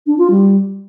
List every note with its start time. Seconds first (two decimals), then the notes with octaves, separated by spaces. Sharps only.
0.06 D4
0.18 F4
0.30 G3